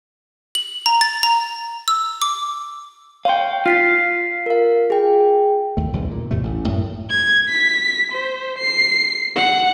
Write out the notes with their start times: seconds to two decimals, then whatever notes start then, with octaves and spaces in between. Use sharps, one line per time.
0.55 F#7
0.86 A#5
1.01 A6
1.23 A#5
1.88 E6
2.22 D6
3.25 C#5 F5 G5 C6
3.66 F4 A6 B6 C7
4.46 A#4 F5
4.90 G#4 G5
5.77 D#2 A3
5.93 B1 E2 G#2 D3
6.11 A#2
6.31 E2 A2 C3 A3
6.43 A1
6.66 F#2 A2
7.10 G#6
7.49 B6
8.12 C5
8.59 C7
9.36 F#5